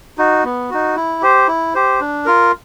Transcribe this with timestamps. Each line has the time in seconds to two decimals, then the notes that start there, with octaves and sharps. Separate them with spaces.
0.18 D#4 F#4
0.44 B3
0.70 D#4 F#4
0.96 E4
1.22 G4 C5
1.48 E4
1.74 G4 C5
2.00 D4
2.25 F4 A#4